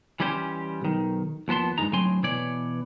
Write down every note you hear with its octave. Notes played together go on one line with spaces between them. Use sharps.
E3 G3 C#4 G4 C5
B1 D#3
D#2 F3 B3 A5 C6
G2 G#3 D#4 A#5
D2 A2 F#3 C4 G#5 C6
B2 E3 C#5 D5